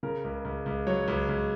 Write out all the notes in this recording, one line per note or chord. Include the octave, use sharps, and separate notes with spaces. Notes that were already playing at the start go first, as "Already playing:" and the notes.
C#3 A#4
C#2
C#2
C#2
F#3 C#5
C#2
C#2